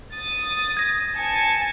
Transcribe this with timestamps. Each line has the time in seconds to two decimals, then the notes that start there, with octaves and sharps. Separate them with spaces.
0.13 D#6 A6
0.77 G#6 A#6
1.16 G#5 A5 C#7